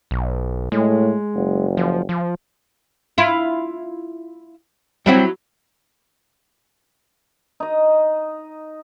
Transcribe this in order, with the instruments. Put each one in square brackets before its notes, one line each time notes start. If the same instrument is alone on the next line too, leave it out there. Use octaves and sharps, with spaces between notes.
[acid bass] B1
[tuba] A2 [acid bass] G#3
[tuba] F#1
[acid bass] F3
F3
[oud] E4 F4
[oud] F#3 E4 F#4 [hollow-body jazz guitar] G3 C4 E5
[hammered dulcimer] D#4 D#5